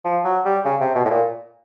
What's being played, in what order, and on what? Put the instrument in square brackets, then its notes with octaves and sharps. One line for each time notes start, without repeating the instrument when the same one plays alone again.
[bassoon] F3
F#3
G3
C#3
C3
B2
A2
A#2